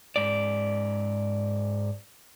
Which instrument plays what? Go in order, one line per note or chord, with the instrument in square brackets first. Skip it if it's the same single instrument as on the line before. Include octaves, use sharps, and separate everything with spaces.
[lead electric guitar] G#2 D5